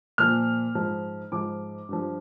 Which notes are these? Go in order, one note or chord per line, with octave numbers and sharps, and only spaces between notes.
A#2 F3 F6
G#2 F3
G#2 F3 D6
G2 F3